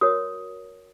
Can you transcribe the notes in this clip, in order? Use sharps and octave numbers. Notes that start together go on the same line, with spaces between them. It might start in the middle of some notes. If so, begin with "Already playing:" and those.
F#4 A#4 C#5 D#6